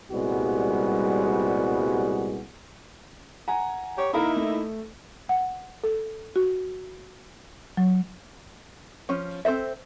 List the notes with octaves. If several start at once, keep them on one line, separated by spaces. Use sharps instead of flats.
C2 A#2 G3 G#3 B3 F#4
F#5 G#5 A#5
G4 C#5
A#3 D#4 E4 A#4 F5 B5
A3
F#5
A4
F#4
F#3
F3 C#4
C4 A4 C5 E5